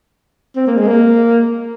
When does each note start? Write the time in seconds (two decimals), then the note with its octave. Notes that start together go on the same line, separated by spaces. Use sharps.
0.56 C4
0.67 A#3
0.78 G#3
0.88 A#3